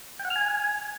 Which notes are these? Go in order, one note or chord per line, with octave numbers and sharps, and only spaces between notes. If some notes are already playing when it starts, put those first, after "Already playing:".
G5
F#5
F6
G#5